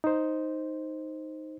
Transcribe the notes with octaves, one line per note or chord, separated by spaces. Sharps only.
D#4 C5